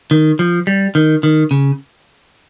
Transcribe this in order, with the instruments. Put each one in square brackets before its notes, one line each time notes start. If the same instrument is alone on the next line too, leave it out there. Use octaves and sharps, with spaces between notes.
[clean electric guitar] D#3
F3
G3
D#3
D#3
C#3